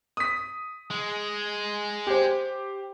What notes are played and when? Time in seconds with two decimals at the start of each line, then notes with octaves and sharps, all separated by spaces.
0.17 D#6 B6
0.91 G#3
2.07 G4 C5